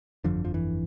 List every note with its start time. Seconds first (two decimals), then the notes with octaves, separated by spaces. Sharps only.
0.24 G1 F2 D3 F3
0.45 F3
0.54 E3